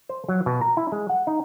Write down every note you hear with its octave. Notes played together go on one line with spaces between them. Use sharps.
C5
F#3
B2
A#5
E4
G#3
F#5
D#4